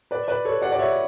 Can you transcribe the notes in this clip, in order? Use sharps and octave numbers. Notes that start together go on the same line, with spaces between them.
B4 D5
B4 D5
A4 C#5
D5 F#5
D5
C#5 E5